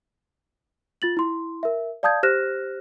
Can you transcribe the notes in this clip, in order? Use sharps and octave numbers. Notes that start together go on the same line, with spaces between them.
F4 A6 F#7
E4 C6
A#4 E5
D5 F5 A5 D#6 G6 G#6
G4 C5 F6 F#6 A#6 E7